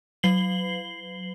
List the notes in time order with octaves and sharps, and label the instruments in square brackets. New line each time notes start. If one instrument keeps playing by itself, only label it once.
[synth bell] F#3 C7 F#7 G7